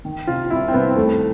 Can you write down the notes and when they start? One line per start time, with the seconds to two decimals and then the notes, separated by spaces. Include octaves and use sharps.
0.05 D#3
0.27 C3 F4
0.50 C2 E4
0.68 C4
0.73 C2 B3
0.96 D#2 A3